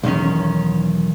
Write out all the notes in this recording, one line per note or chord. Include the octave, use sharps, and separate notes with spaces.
B1 E2 D#3 C#4